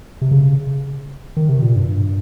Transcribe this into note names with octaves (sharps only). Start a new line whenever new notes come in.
C3
C#3
D#3
C3
A#2
G2